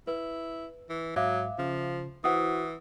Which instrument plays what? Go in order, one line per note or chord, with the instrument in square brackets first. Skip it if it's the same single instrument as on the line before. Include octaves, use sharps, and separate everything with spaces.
[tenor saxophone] E4 [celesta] B4
[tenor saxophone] E3
[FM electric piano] G#2 [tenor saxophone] F#3 [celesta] E5 F5 D6
[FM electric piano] C#3 [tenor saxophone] F3
[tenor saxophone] E3 [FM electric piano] E4 F#4 C5 [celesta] F#5 D#6